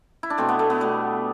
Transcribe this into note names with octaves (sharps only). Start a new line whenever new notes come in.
E4
D4
B2 A3 C4
B3
A3
B3
B2 G3 A3